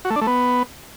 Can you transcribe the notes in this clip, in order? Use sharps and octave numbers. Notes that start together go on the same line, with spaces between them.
F#4
A3
D4
A3
B3